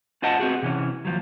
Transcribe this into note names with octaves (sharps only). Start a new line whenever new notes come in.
C#4 F4 C5 D#5 F#5 A5
B3 C4 F#4 G#4
C3 E3 C#4
D#2 F3 F#3